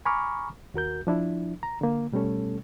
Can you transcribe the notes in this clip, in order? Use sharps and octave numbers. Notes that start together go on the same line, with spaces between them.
G#5 A#5 B5 C#6 D6 F6
D#2 F#4 A#4 G6
F3 D4 E4
A#5
D3 A#3
B2 G3 A3 C#4 A4